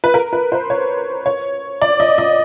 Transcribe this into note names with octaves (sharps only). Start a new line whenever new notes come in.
B4
A#4
B4
C5
C#5
C#5
D5
D#5
D#5